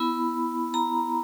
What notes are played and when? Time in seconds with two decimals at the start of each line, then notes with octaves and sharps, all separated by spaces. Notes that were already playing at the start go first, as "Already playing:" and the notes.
Already playing: B3 E4 B5
0.74 A#5